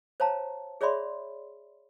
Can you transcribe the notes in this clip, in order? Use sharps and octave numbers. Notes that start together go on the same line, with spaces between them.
C5 C#5 F5 A5 A#5
G#4 C#5 D5 E5 B5 C6